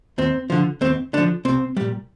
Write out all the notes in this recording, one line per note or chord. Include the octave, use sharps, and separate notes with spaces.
D#2 C4
D3 F3
D#2 C4
D3 F3 D4
C2 C4
A#2 G3